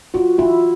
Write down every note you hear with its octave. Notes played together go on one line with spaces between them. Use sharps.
F4 F#4
E4 F4